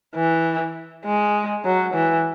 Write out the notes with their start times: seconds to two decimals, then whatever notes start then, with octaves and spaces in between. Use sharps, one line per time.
0.15 E3
1.05 G#3
1.65 F#3
1.94 E3